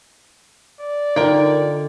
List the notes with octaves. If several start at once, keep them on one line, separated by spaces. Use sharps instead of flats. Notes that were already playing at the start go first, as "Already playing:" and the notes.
D5
D3 D#4 F4 A#4 G5